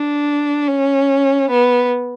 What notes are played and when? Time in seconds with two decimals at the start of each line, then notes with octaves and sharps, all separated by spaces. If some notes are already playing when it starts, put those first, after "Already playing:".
Already playing: D4
0.67 C#4
1.50 B3